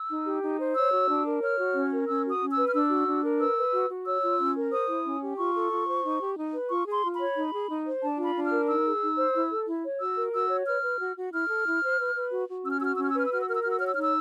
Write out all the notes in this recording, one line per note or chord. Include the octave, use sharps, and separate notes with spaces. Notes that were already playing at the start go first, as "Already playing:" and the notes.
Already playing: E6
D#4
G4
D#4
C5
C#5 E6
F#4
D4
A#4
C#5 F6
F#4
C#4
A#4
C#4 E6
F#4 D#6
C#4
E6
B4
F6
D4 E6
F#4
D4
A#4
B4 E6
B4
F#4
F#4
C#5 E6
F4
C#4
A#4
C5 D#6
E4
C#4
G4
F4 C#6
A4
F4
C5
D#4
G4
D#4
B4
F4 C#6
G#4
C6
F4
C#5 B5
D#4
G#4
D#4
C5
D4 A5
F4
B5
D4
F6
A#4
D#4 E6
G#4
D#4
C5
E4
A4
E4
C#5
F#4 E6
A#4
F#4 E6
C#5
B4 F6
B4
F#4
F#4
E4 F6
A4
E4
C5
B4
B4
F#4
F#4
C#4 E6
F6
F#4 E6
F6
C#4 E6
F6
E6
B4 F6
E6
F#4 F6
E6
A#4 F6
E6
F#4 F6
E6
C#5 F6
E6
D#4 F6
E6